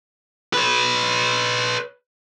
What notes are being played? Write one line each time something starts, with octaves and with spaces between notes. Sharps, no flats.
B4 C#5